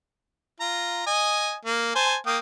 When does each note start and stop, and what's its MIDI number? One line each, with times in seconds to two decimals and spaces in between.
0.60 1.06 65
0.60 1.06 82
1.07 1.54 75
1.07 1.54 80
1.65 1.94 58
1.95 2.16 72
1.95 2.16 80
1.95 2.16 81
2.26 2.38 58
2.26 2.38 79
2.26 2.38 87